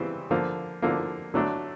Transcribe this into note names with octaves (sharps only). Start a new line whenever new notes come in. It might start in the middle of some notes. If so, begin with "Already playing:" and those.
Already playing: C#3 E3 G3 C4
D3 F3 A#3
D3 F3 A#3
D3 F#3 A3 D4